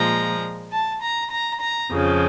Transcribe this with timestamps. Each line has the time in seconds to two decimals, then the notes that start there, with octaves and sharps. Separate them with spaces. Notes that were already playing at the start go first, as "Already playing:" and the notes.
Already playing: A#2 F3 G#3 A#5
0.71 A5
1.02 A#5
1.31 A#5
1.61 A#5
1.92 F2 C#3 F3